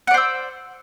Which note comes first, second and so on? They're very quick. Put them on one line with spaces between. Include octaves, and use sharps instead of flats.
F#5 D5 C5 E6